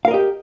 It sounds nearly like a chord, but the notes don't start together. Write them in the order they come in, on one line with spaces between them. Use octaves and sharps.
F5 A#4 D#5 G4